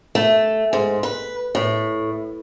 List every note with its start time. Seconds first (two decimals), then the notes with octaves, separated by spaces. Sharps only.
0.15 A3
0.73 G#2
1.03 B4
1.55 A2